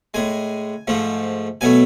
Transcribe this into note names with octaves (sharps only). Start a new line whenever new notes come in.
A2 G#3 G#5
G#2 F3 A3
B2 F#3 A3 G#5